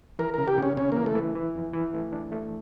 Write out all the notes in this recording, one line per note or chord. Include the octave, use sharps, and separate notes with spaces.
E3 A#4
C#3 A#4
G4
C#3 C#4
C#3 C#4
E3 A#3
A3
E3
E3
F2
E3
A3
D4
A3